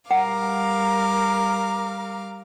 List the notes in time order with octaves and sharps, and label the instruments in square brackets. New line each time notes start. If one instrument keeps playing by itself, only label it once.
[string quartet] G3 F5 D6 [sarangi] A#4 [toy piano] F#5